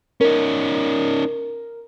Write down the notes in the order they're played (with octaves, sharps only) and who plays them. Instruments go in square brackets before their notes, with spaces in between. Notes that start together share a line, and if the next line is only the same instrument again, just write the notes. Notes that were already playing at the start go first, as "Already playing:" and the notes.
[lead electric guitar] C#4 D#4 [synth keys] A#4